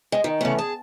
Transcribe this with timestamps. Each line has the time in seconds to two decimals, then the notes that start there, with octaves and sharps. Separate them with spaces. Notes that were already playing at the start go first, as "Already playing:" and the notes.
0.12 G#3
0.24 D#3
0.41 C#3 E3 A3 B3 C#4
0.59 G#4 A5